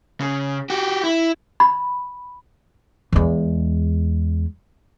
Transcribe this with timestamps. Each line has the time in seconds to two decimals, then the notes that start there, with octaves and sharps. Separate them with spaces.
0.21 C#3
0.70 F#4 G4
1.04 E4
1.60 B5
3.12 E2 G#3